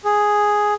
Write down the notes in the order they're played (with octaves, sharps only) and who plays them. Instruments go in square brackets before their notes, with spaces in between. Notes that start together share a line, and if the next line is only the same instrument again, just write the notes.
[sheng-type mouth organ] G#4